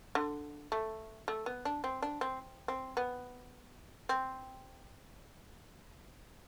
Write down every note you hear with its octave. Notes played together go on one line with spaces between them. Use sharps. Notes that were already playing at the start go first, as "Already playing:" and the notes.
D3
A3
A3
B3
D4
C4
D4
C4
C4
B3
C4